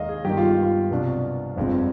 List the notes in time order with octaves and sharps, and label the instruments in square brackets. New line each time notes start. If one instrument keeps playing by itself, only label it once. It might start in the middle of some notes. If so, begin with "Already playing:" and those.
Already playing: [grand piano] D#2 D#3 G#3 D#5 F5
G#4
G2 D#3 G#3 B3 G4
F4
F4
C2 B2 B3 D4
G1 F2 D3 G#3